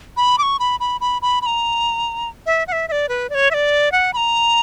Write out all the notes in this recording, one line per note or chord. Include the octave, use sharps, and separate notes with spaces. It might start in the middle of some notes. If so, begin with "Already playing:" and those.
B5
D6
C#6
B5
B5
B5
B5
B5
A#5
E5
F#5
E5
E5
D5
B4
D5
C#5
E5
D5
F#5
B5
A#5